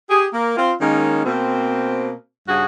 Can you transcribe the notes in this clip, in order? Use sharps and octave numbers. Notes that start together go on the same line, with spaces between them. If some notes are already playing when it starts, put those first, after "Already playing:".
G4 G#4
A#3
C4 F4
D#3 G#3 A#3 C#4
B2 A#3 C4
G2 C#3 F#4 G#4